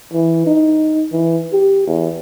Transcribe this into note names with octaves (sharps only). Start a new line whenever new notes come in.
E3
D#4
E3
G4
E2